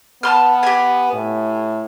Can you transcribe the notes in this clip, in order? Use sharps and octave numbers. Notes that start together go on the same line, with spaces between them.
B3 A5 C6 F6
G4 G#5
A2